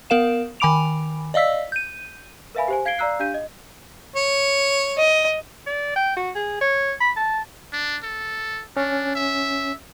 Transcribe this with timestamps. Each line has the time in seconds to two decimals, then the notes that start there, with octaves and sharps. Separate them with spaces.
0.10 B3 A#4 F5 E7
0.60 D#3 G#5 B5 D6 D7 F7
1.34 D5 D#5 F5 E6 B6
1.72 G6 D#7
2.55 A#4 B4 E5 F5 G#5 B5
2.68 G4 C5 G#5
2.85 F5 G#6 C7 D7 G7
2.98 D5 F5 A#5 E6 F#6 C7
3.20 D4 G4 F5 G6 D#7
3.34 D#5
4.16 C#5
4.98 D#5
5.67 D5
5.96 G5
6.16 F#4
6.35 G#4
6.61 C#5
7.00 B5
7.16 A5
7.73 D4
8.04 A4
8.77 C#4 D4
9.15 E5